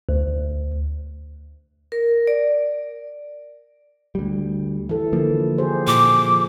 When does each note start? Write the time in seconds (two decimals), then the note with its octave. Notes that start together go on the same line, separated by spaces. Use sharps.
0.09 D2
1.92 A#4
2.27 D5
4.15 D2 G3
4.89 E3 A4
5.13 D3 F3 A#3
5.58 G4 G#4 C5
5.87 A#2 D6